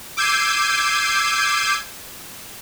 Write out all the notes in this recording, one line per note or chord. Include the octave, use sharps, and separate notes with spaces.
D6 E6 G6 G#6 C7 D#7